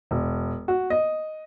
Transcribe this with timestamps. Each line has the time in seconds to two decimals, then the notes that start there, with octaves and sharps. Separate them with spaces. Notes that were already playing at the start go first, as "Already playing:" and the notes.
0.11 E1
0.68 F#4
0.90 D#5